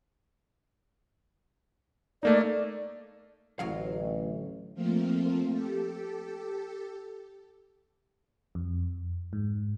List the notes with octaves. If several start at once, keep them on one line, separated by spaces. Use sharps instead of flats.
A3 A#3 D#4 D5
A1 D2 F#3 F5
F3 A3 A#3 C4 F4
G4 A4
F2
G#2